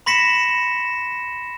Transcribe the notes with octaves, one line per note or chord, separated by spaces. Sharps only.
B5 C6 A#6 B6 C#7 E7